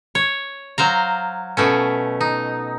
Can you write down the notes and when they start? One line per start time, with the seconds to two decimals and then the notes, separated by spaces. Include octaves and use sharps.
0.15 C#5
0.78 F#3 C5 F5 A#5
1.57 B2 A3 C#4
2.21 D#4